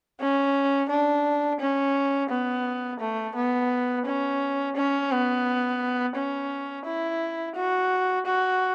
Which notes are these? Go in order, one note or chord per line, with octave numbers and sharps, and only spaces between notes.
C#4
D4
C#4
B3
A3
B3
C#4
C#4
B3
C#4
E4
F#4
F#4